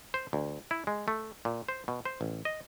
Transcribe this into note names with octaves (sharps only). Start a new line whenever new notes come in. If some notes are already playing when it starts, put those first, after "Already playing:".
C5
D2
E4
G#3
A3
A#2
C5
B2
C5
A1
D#5